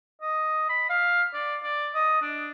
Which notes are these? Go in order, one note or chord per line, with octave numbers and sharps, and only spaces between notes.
D#5
B5
F5
D5
D5
D#5
D4